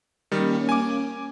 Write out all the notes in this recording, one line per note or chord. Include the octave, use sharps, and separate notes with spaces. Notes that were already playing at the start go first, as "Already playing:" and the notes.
D#3 G3 A#3 C#4
G#5 D6